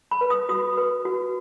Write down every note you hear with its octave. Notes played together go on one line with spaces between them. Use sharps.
B5
B4
D#6
F#4 D#6
B4
F#4